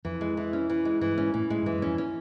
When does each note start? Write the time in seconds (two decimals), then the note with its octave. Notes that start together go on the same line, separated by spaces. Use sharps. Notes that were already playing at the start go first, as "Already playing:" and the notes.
0.05 F2 E3
0.21 G#3
0.37 E3
0.53 C#4
0.70 E3
0.85 G#3
1.01 G2 E3
1.18 G#2 C#4
1.34 A2 E3
1.50 A2 G#3
1.62 G2 E3
1.74 F#2
1.82 F2 C#4
1.98 C#4